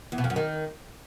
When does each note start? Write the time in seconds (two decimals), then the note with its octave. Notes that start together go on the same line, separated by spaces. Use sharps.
0.12 E2
0.18 B2
0.24 F2
0.30 F#2
0.36 D#3